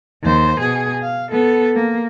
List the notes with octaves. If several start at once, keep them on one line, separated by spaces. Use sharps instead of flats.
D#2 C5
B2 G#4
F5
B3 A4
A#3